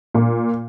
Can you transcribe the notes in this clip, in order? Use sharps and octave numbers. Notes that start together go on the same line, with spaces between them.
A#2